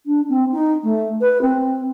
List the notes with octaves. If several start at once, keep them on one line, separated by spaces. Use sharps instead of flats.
D4
C4
D#4
A3
B4
C4